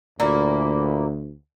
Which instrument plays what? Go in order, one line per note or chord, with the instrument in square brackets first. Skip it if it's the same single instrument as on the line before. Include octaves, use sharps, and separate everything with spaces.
[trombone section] D2 [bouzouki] A#2 A#3 E4